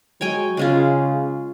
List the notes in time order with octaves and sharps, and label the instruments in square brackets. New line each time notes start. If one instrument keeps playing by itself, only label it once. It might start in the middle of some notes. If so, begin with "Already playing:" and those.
[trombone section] F#3 G#3 [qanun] C#5 G5 G#5
[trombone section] C#3 [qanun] G#3 C#4 F4